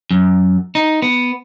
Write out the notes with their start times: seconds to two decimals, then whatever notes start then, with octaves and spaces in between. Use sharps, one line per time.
0.11 F#2
0.75 D#4
1.02 B3